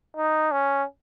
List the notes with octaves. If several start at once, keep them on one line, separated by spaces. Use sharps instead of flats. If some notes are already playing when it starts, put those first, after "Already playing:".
D#4
C#4